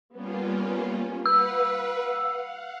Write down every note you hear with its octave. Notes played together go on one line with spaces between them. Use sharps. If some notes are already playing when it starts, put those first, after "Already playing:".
G3 A#3 B3 C#4 F4
B4 F5 F#5 E6